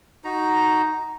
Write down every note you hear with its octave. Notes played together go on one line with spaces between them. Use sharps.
D#4 F#4 A#5